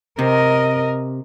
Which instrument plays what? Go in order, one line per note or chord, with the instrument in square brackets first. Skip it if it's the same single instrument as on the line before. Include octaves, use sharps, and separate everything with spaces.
[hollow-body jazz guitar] C3 [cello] A#4 D#5